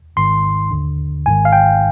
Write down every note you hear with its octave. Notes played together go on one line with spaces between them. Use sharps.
G#1 G#2 D#3 C6
D#2 D3
G#1 G#2 D#3 G#5
F5
G5